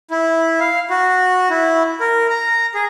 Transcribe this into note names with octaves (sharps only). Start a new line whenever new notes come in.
E4
F5
F#4
E4
A#4
A#5
G#4